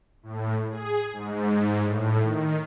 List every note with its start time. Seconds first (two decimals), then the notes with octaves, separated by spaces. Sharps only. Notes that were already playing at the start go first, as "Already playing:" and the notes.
0.23 A2
0.70 G#4
1.13 G#2
1.82 A2
2.22 D#3